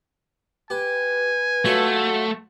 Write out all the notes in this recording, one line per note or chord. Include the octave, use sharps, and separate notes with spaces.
G4 B4 G#5
F#3 A3 F4 F#4